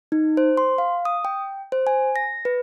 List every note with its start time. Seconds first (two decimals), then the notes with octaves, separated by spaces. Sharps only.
0.12 D#4
0.37 C5
0.57 C6
0.78 F5
1.05 D#6
1.25 G5
1.72 C5
1.87 G#5
2.16 A#6
2.45 B4